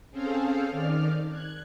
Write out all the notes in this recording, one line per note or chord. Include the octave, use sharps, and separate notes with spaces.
C4 C#4 G#4 A4 C5 F5
D#3 D5 F6
F#6 G#6